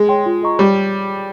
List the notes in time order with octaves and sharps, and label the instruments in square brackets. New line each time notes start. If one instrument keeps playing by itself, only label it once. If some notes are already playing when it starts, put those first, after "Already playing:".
Already playing: [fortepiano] G#3
[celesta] C#5 G5 C6
F4
G#4 D#5 A#5 C#6
[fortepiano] G3 [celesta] C#5